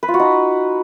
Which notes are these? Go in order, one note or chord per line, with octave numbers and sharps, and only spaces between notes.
B4
F4
F#4
D#4